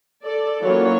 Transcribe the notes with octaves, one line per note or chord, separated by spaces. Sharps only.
A4 D5
E3 F#3 A#3 C#4 F4 C#5